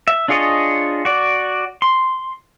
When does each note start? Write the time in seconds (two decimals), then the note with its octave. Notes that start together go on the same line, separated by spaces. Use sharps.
0.08 E5
0.28 D4 F4 G#4 C#5 D#5
1.05 F#4 D5
1.82 C6